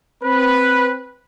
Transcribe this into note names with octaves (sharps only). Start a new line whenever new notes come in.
C4 B4